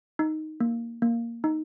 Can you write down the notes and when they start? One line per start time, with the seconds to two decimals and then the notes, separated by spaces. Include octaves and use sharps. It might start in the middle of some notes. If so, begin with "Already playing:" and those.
0.19 D#4
0.60 A#3
1.02 A#3
1.44 D#4